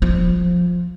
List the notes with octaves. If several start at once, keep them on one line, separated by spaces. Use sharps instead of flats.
F3